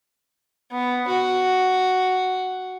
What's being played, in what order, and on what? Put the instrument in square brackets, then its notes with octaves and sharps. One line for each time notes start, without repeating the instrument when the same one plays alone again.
[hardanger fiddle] B3
F#4